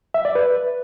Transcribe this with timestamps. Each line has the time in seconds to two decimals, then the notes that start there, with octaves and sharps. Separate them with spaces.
0.14 E5
0.25 D5
0.35 B4